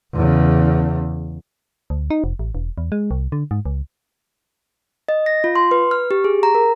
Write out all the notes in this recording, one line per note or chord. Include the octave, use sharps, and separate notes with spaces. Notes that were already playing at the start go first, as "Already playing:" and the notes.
E2 C#3
D2
D#4
F1
A1
E1
E2
G#3
C2
D3
G#2
C#2
D#5
A#6
F4
C6
B4
F6
G4
G#4
A#5
A#4